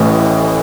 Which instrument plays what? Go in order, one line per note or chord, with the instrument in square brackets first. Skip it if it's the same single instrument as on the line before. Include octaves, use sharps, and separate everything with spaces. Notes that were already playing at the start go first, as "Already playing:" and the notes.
Already playing: [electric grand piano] A1 A2 E3